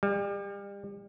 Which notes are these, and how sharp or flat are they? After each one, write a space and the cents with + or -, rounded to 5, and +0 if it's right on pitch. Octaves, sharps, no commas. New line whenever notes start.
G3 +35